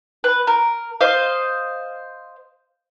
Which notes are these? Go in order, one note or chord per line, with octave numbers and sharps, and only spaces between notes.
B4
A#4
C5 D#5 F5